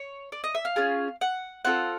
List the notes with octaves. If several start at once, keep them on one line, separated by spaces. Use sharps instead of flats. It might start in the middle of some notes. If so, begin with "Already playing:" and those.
Already playing: C#5
D5
D#5
E5
F5
C#4 F4 G#4
F#5
C4 F4 A4 F#5